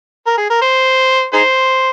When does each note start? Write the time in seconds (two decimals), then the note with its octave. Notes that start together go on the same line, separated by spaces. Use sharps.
0.26 A#4
0.38 G#4
0.50 A#4
0.62 C5
1.33 D#4 G#4 C5